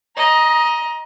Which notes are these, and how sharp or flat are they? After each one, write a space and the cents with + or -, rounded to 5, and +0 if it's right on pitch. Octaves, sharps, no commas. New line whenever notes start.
D#5 +5 A#5 +25